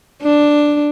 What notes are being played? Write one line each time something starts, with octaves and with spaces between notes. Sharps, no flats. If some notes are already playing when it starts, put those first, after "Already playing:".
D4